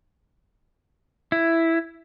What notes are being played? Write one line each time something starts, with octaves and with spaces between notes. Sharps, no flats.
E4